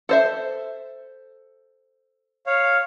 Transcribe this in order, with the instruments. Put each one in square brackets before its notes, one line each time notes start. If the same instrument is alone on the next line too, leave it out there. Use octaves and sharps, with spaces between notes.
[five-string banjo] A4 C5 E5
[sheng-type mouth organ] C#5 F5